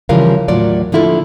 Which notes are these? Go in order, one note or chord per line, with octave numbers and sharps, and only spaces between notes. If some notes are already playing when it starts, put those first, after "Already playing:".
C#3 E3 F3 G3 A#4 F5
D#2 A2 F#3 A#3 F4 D5
D3 F3 A#3 E4 F4 A4